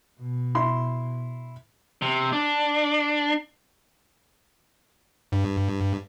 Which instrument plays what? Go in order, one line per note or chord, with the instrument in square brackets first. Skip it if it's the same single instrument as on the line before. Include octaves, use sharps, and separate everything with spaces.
[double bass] B2
[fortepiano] E4 C6
[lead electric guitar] C3
D4
[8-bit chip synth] G2